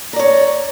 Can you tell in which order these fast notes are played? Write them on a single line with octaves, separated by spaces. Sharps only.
A#5 D5 C#5